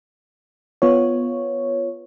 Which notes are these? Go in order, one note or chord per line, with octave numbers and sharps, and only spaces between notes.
B3 F4 C#5